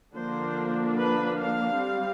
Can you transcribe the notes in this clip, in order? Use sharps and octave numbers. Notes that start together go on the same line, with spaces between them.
D3 F3 A#3 D4 C5
B4
F5
G3 C4